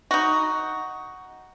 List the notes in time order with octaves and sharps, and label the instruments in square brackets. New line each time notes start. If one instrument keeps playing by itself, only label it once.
[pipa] D#4 F#4